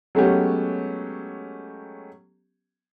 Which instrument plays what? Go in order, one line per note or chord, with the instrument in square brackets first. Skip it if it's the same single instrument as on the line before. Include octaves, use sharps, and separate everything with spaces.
[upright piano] F#3 G#3 A3 B3 C#4 G4